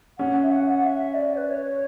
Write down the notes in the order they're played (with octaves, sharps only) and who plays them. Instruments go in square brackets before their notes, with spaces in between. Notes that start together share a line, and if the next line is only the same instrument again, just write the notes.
[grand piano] C#4 [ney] F#5
[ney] E5
F#5
F#5
E5
D5
B4
C#5